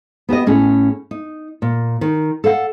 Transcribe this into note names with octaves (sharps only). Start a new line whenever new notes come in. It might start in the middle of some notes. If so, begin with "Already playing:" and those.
B3 F#4 G4 D#5
A2 C#4 G#4
D#4
A#2
D#3
A4 D5 F5 F#5